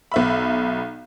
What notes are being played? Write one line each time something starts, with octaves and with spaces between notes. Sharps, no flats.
B1 E5 B5